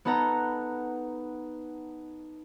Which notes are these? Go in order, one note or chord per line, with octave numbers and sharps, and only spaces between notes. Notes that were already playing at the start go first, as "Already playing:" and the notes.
B3 D#4 A4 F#5 A#5